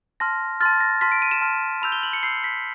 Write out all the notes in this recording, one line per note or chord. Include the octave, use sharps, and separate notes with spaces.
A5 C6 F6 A#6
A5 C6 F6 A6
A#6
A5 C6 F6 B6
D7
D#7
E7
A5 C6 F6
B5 E6 G6 F7
G7
F#7
C#7
B5 E6 G6 C7
B6